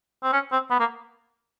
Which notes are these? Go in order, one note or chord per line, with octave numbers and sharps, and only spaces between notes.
C4
C#4
C4
B3
A#3